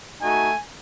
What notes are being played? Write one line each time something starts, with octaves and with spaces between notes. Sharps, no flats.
A3 D#4 F#4 G#5